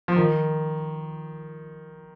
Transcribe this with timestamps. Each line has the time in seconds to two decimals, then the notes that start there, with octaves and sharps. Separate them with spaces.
0.08 F3
0.16 D#3